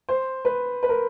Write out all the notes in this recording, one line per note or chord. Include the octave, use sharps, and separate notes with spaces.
C5
B4
B4
A#4